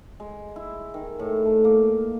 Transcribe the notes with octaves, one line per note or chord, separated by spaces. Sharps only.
G#3
E4
D#3
A2
A3
A#3